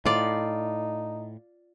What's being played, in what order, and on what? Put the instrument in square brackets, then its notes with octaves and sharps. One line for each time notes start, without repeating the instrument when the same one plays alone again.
[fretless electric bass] A2 [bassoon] D#4 [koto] F4 D5